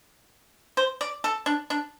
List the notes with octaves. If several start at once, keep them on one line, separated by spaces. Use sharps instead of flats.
C5
D5
A4
D4
D4